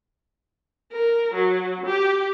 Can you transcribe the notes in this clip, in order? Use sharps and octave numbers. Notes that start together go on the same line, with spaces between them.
A#4
F#3
G4